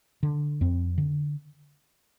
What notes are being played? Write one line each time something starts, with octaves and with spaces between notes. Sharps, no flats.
D3
F2 C4
D3